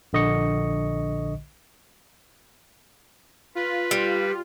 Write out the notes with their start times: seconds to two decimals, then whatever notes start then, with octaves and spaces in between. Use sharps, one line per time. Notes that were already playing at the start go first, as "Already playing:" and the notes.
0.13 A#1 D3 D#5 C#6 C#7
3.55 F4 B4
3.91 G3